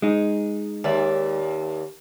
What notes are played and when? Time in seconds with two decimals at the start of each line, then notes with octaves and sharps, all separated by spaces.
0.02 G#3 D#4
0.84 D#2 D5 E5